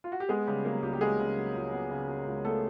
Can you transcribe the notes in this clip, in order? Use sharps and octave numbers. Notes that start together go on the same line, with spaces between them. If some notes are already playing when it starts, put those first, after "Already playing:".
F4
F#4
G4
G#3 B3 G#4
C#3 G3 G4
F#3 A#3 A#4
C#2 G3 G4
G4
G#3 B3 G#4
C#3
F#3
C#2
B3
C#3
F#3
C#2
A3 B3 A4